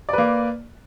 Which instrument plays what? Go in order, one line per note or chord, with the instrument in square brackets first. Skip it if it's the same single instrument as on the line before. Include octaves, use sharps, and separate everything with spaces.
[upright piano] D5
B4
A#3